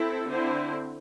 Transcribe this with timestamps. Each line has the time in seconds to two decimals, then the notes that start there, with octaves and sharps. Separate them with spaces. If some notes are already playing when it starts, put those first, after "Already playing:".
Already playing: C4 E4 A4
0.27 D3 C4 E4 C5